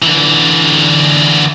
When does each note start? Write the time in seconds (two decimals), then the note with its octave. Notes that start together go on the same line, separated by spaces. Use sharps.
0.02 D3 E3